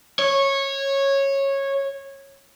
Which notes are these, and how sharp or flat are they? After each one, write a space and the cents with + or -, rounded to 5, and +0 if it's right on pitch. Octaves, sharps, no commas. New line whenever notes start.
C#5 -15